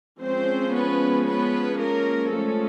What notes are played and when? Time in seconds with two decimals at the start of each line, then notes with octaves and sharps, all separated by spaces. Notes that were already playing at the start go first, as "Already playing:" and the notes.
0.19 F3 G#3 C4 C#4 C5
0.73 B3 B4
1.27 B3 B4
1.80 A#3 A#4
2.33 F3 G#3 A3 C#4 A4